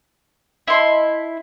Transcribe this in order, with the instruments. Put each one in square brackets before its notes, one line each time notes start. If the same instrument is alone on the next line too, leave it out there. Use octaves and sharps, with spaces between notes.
[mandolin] E4 C6 [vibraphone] D#5 A5